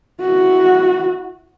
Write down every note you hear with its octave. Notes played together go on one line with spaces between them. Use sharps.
E4 F#4